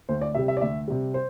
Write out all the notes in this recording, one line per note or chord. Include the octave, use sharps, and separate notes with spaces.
D2 C5
D5
C3 G3 E5
E5
D5
D2 E5
C3 G3
C5